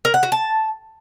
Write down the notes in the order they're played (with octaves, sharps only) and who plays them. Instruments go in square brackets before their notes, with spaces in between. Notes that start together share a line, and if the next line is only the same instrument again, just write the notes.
[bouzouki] A#4
F#5
F#4
A5